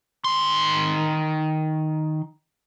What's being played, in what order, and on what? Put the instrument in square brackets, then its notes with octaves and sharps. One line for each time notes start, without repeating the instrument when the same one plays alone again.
[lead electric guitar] D#3 C6